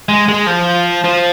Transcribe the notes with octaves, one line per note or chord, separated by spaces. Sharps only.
G#3
G#3
F3
F3